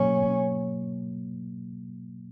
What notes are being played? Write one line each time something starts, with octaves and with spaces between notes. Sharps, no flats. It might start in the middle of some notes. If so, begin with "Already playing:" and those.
Already playing: B2 F#3 A#3 C#4